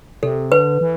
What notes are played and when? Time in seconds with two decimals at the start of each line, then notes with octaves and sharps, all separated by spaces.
0.23 C3 A4
0.52 D3 B4
0.81 E3